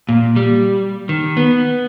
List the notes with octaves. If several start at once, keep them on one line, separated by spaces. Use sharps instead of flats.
A#2
G3
D#3
B3